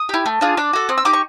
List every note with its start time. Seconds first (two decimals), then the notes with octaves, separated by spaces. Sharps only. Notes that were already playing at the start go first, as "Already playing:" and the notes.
Already playing: D#6
0.09 E4 G4
0.26 A3
0.41 D4 F4 G#4
0.57 D4 D6
0.73 F#4 A4
0.89 C4 D#6
0.98 E6
1.05 D#4 G4 D6
1.13 C#6